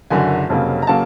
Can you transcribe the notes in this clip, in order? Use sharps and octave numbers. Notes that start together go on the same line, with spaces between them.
F#1 F#2 D3 G#5
F1 F2 C#3 F#3 A#3
A#5
C#3 F#3 A#3 A5